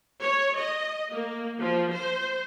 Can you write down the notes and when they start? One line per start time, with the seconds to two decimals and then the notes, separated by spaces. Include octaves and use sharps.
0.22 C#5
0.58 D#5
1.11 A#3
1.60 F3
1.93 C5